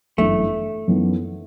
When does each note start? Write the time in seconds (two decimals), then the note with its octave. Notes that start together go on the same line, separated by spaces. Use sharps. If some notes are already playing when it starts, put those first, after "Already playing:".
0.18 G1 F#2 E3 A3
0.88 F#2 E3 B3 D#4